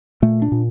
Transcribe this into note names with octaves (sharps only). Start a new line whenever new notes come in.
A#2 A3
D4
A#2